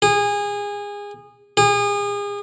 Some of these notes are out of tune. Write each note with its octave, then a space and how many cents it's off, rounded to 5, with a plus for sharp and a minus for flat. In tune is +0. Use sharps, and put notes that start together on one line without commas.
G#4 -25
G#4 -35